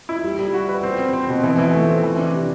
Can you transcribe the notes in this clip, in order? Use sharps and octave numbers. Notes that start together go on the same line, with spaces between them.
E4
G3
G3
F#4
B4
C4
C4
C4
B2
E3
E3
A3
C4
E3
D4
C3